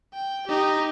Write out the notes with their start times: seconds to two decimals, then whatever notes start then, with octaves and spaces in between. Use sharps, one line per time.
0.13 G5
0.47 D#4 G4